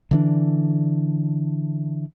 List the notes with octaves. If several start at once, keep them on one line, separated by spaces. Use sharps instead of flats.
D3 E3 D4